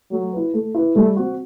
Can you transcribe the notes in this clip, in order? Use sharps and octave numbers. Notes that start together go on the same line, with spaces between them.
F#3 A3
E4 B4
A3
E4 B4
G3 A3
C4 F#4